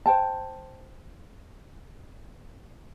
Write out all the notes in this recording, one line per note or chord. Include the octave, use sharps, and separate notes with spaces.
C5 G5 A5